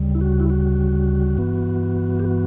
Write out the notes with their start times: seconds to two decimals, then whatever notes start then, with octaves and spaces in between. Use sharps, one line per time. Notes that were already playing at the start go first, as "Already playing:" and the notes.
Already playing: D2 C#3 G3
0.15 E4
0.21 F#4
0.40 E4
0.50 F#4
1.37 G2 E3 B3
2.20 G4
2.25 F#4